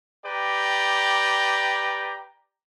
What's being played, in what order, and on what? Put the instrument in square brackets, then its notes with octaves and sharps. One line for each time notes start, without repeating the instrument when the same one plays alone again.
[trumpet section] G4 B4 D5 G5 A#5